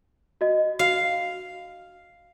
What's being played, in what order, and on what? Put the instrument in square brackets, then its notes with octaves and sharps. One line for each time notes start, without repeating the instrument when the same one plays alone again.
[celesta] F#4 D#5
[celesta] F#4 [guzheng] F5